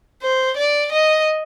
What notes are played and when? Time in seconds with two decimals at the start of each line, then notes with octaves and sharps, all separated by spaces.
0.22 C5
0.57 D5
0.92 D#5